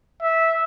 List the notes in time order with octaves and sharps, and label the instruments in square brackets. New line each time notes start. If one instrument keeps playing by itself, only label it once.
[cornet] E5